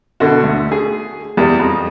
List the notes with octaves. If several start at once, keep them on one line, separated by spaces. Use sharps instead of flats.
B2 D3 F#4
D2
G#4
E2 G3
F2